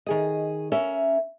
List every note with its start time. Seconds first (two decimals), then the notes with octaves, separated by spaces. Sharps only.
0.06 D#3 G#4 D#5
0.72 C#4 A#4 E5